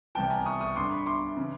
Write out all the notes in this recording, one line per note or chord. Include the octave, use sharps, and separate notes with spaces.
C2 C3 E3 G5 A5
G#5 A#5
C#6 D#6
C#6 D#6
G2 D3 C6 D6
B5 C#6
C6 D6
C#3 E3